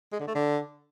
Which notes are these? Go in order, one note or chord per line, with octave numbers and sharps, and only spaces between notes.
G#3
D3
A3
D3